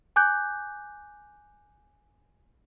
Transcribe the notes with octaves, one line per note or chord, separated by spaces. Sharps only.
G#5 D6 F#6 G6